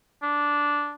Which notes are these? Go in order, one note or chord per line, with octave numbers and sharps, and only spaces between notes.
D4